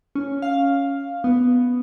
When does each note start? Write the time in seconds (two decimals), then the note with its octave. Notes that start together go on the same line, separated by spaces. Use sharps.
0.15 C#4
0.42 F5
1.24 B3